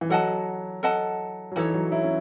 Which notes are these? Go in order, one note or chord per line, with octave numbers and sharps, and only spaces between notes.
E3
F#3 A4 D#5 F#5 A5
A4 D#5 F#5 A5
F#3
E3 D#4 A4 C#5
F#3
E4
C#4